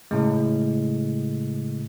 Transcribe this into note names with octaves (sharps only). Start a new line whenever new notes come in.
A2 C#3 G#3